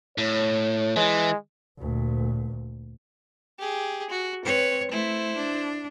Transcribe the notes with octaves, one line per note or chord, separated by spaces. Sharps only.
A2 C#5
E3 G#3
D2 A#2
G4 G#4
F#4
C4 B4 C#5
A3 E4 C5
D4